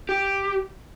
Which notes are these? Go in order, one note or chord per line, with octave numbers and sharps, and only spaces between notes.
G4